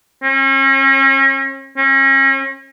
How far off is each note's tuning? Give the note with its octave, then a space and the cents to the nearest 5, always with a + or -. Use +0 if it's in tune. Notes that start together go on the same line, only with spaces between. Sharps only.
C#4 -40
C#4 -40